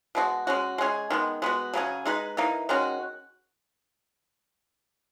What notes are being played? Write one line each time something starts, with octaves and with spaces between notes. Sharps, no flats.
B2 G#3 D#4 F#4
G#3 C#4 F#4
G#3 C#4 G#4
D#3 G#3 B3
G#3 B3 F#4
C#3 F#3 C#4 G#4
G#3 D#4 G#4 B4
E3 A#3 D#4
D#3 G#3 C#4 F#4